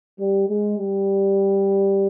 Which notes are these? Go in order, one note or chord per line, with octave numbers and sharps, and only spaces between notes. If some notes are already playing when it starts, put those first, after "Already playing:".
G3
G#3
G3